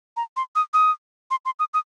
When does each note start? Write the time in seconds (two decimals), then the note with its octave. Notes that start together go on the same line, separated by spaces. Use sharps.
0.17 A#5
0.36 C6
0.56 D#6
0.74 D#6
1.31 C6
1.45 C6
1.59 D#6
1.74 D#6